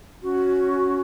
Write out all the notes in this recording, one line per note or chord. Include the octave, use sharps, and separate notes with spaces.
C#4 F#4